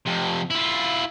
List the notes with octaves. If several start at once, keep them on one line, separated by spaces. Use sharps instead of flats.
F2 C3
E4 F4